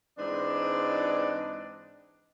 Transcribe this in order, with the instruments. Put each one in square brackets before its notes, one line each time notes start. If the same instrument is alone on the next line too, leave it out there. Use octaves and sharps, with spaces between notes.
[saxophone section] G#2 E3 C4 D4 D5 D#5